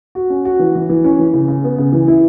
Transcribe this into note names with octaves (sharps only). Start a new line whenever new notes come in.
F#4
C#4
F#4
E3
E3
E3
C#4
E3
C#3
C#3
B3
C#3
E3
E4